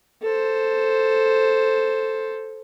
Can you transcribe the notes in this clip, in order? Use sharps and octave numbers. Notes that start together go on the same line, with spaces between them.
A4 C5